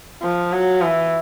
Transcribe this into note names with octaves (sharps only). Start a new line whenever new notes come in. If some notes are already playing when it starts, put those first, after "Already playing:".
F3
F#3
E3